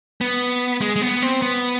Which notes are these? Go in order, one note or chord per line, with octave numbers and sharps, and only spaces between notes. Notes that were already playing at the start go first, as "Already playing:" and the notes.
B3
G#3
G#3
B3
C4
B3